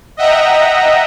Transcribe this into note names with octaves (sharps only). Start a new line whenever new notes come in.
D#5 E5 F#5 G5 A#5